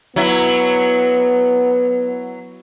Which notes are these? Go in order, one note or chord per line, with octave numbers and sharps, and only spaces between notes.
F#3 B3 E4